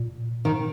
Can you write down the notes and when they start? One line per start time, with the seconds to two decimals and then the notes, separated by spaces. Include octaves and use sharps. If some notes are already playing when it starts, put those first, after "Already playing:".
Already playing: A#2
0.45 D#3